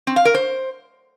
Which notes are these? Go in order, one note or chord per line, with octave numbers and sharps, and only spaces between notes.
C4
F5
A#4
C5